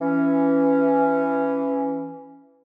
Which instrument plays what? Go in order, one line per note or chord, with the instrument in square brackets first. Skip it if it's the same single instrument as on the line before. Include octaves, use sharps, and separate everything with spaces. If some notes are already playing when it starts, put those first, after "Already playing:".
[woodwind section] E3 C#4